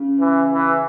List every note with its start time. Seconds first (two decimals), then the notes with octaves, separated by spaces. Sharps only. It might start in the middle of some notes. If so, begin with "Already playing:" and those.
Already playing: C#3
0.20 E3
0.51 E3